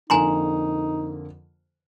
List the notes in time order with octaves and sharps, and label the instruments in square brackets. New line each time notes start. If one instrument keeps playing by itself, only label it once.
[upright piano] F2 D3 A#3 [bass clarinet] D#4 [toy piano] G#5 A#5 C6